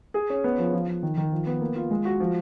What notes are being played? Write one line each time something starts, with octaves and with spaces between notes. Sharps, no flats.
G#4
C#4
B3
F3
F3
F3
D#3
D#3
F3
B3
A#3
F4
G#3
F#4
F3